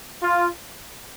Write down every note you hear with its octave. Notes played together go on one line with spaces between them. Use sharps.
F4